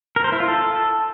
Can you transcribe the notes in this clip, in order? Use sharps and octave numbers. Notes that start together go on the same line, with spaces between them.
A#4
C5
E4
F4
A4